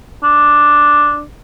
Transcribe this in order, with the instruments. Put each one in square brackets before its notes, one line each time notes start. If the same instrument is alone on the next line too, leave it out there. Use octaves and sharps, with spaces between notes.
[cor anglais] D4